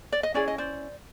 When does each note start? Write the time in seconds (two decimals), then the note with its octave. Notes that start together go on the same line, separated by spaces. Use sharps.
0.12 D5
0.23 D#5
0.34 C#4 E4 G#4 D5
0.48 D#5
0.58 C5 D5